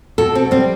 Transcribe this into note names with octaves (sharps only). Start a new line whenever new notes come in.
B2 A4
C4
G3 C4